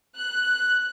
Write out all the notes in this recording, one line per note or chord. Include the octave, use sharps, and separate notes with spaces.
F#6